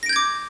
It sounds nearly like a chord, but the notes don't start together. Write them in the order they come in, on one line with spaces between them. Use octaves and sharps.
A#6 D7 G6 G#6 D6